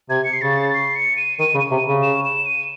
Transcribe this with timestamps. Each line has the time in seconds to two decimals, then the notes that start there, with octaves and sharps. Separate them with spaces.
0.10 C3 G#6
0.24 C#7
0.33 C7
0.41 C#3 A6
0.74 C7
0.96 C#7
1.17 D#7
1.39 D#3 D#7
1.55 C#3
1.60 D#7
1.71 C3
1.88 C#3
2.03 E7
2.25 E7
2.46 D#7